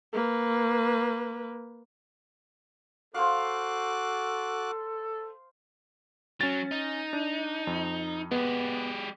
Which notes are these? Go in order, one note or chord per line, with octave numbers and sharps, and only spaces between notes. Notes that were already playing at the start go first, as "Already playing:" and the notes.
A#3 B4
F#4 A4 C5 F5 D6 F#6
F#3 C#4 A6
D#4
D4
F2
G#3 B3 G4